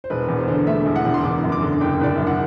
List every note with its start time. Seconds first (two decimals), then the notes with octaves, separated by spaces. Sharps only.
0.04 C5
0.10 E1 B4
0.28 E2
0.38 C5
0.48 D3
0.67 A3 E5
0.85 E1
0.96 F#5
1.05 E2
1.14 C6
1.24 F#1 D6
1.43 F#2
1.52 D6
1.62 D3
1.81 F#1 G5
2.01 F#1 D5
2.15 F#2 E5
2.27 F#5